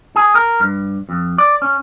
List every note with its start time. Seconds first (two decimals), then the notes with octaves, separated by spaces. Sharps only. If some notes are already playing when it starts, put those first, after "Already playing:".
0.16 G#4
0.35 A#4
0.60 G2
1.09 F2
1.38 D5
1.62 C#4